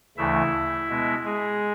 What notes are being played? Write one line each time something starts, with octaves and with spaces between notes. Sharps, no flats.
D2 C#3 E3 A3 E4 E5
B2 G#3 B3
G#3 G#4